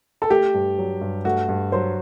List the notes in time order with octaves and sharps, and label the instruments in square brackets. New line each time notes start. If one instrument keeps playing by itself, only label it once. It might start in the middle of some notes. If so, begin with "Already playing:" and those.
[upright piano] A4
[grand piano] A3 [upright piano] G4
[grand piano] G2
F#3
G2
[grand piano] A3 [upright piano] F#4
[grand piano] G2
[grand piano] F#3 [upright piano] C5